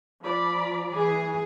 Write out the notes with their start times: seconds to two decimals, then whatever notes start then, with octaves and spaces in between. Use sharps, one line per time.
0.22 F3 D5 B5
0.94 E3 G#4